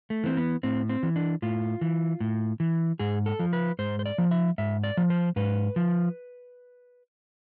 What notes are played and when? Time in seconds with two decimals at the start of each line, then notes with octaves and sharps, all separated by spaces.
0.10 A3
0.24 E3 C4
0.37 B3
0.63 A2 C4
0.89 C4
1.03 E3
1.16 D4
1.42 A2 F4
1.81 E3
2.20 A2
2.60 E3
2.99 G#2 G#4
3.26 A4
3.39 F3
3.53 B4
3.79 G#2 C5
3.99 C5
4.06 D5
4.18 F3
4.31 E5
4.58 G#2 E5
4.84 D5
4.97 F3
5.10 C5
5.36 G#2 B4
5.76 F3